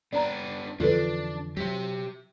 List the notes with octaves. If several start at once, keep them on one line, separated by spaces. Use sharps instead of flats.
B3 D4 D5 A#5
F2 D3 E3 D4 F4 A4 B4
F#3 G4 E5